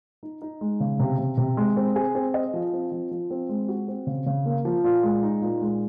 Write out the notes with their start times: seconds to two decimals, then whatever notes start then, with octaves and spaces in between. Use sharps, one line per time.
0.23 D#4
0.42 D#4
0.61 G#3
0.80 C#3
0.99 C3
1.19 C3
1.37 C3
1.57 G#3
1.76 C4
1.96 G#4
2.15 C4
2.34 D#5
2.54 F3
2.73 C4
2.92 F3
3.11 F3
3.31 C4
3.49 G#3
3.68 F#4
3.88 C4
4.07 C#3
4.26 C#3
4.46 A#3
4.65 F3
4.84 A#2
5.03 G#3
5.23 D#4
5.42 A#2
5.61 G#3